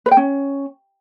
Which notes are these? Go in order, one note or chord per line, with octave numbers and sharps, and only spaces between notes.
B4
G5
C#4